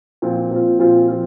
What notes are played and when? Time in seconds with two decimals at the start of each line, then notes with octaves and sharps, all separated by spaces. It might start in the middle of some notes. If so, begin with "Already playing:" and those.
0.22 A#2 F3 C4 F4
0.51 A#2 F3 C4 F4
0.79 A#2 F3 C4 F4
1.08 F3 C4 F4